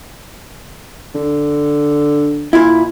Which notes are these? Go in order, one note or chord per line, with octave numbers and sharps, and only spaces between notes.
D3
A#2 E4